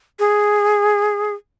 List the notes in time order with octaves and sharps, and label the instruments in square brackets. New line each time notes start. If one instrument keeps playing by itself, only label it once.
[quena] G#4